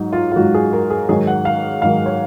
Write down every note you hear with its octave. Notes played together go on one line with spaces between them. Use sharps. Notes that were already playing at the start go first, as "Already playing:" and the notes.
Already playing: G#2 F#3 D#4
F4
F4
G#2 F#3 F#4
G#4
A#4
G#4
G#2 D#3 F#3 G#4
F#5
F5
G#2 D#3 F#3 F5
C#5